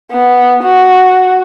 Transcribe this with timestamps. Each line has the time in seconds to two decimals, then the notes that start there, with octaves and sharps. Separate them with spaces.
0.12 B3
0.63 F#4